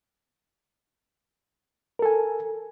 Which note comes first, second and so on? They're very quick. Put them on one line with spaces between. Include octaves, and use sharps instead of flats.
A#4 A4 G#5